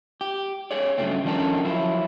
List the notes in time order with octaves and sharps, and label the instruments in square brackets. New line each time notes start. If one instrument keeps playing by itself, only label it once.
[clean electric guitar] G4
G#4 C#5 D5
G2 C#3 F#3 A3 C4
D#3 F3 C#4 D4 A4 A#4
F3 F#3 E4 F4